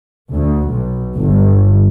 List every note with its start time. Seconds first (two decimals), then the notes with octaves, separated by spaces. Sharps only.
0.33 D2
0.70 B1
1.17 G1